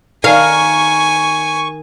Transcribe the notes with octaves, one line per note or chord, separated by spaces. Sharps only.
D#3 A#4 F5 G#5 C#6